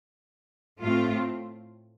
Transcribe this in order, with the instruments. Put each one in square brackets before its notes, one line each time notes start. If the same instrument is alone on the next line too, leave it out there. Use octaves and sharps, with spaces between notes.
[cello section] A2 A3 C4 F4